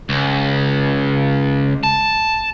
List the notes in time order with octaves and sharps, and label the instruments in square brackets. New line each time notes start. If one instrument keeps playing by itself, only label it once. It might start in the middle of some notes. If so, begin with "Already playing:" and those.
[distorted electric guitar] C#2
A5